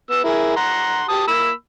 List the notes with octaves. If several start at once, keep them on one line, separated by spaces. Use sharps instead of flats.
B3 E6
E4 G#4 A#4
F#5 A#5 C6
G4 A5 D#6
A#3 B5 E6